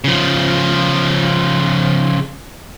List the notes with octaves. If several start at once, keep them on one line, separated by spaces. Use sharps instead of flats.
C#3 F3